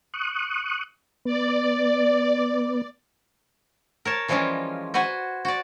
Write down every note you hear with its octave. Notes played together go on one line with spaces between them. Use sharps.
C#6 D#6 F#6
B3 D5
A#4 C#5 A5
E3 F3 G3 G#3 C#4 F4
F#4 B4 C5 F#5 G#5
F#4 D5